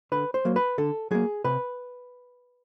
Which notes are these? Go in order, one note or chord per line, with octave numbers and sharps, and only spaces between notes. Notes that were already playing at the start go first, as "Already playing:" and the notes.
D3 B4
C5
F#3 A#3
B4
D3 A4
F#3 A#3 G#4
C3 B4